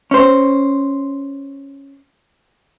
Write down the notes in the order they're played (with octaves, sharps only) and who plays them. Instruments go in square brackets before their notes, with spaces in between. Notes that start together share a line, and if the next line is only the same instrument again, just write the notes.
[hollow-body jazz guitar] C#4 C5